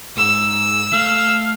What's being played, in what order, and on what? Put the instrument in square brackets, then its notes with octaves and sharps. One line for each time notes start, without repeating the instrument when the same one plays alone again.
[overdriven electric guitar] G#2 [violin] E6
[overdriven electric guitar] A3 [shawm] F5